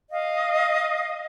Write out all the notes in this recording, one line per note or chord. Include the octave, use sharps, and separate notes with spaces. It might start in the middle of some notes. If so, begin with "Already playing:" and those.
D#5 F5